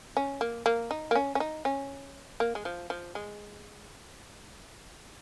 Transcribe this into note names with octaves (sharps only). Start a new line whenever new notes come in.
C#4
A#3
A#3
D#4
A#3
C#4
C#4
D#4
C#4
A#3
G#3
F3
F3
G#3